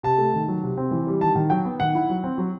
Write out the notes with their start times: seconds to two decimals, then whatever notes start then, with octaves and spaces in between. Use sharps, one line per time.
0.03 C3 A5
0.18 A3
0.34 D#3
0.48 F#3
0.63 C3
0.78 C4
0.91 E3
1.07 G3
1.21 D#3 A5
1.35 D#3
1.50 F#3 G5
1.65 B3
1.80 D#3 F#5
1.95 E4
2.10 F#3
2.24 C4
2.38 F#3